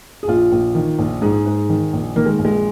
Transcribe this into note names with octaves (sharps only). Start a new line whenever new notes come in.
G#4
A#1 F4
A#1
D#3
A#1
G#2 G#4
G#2
D#3
A#1
D#3 A#3
G#3
A#1
G#3